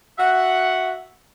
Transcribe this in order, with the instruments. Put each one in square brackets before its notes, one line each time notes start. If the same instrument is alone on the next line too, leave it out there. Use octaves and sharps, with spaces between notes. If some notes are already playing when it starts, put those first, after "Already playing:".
[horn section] F#4 E5 F#5